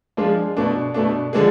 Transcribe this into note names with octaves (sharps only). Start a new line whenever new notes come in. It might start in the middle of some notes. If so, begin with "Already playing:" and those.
F3 G#3 D4 F4 G#4
B2 A3 D4
B2 A3 D4
D3 F3 G#3 D4 G#4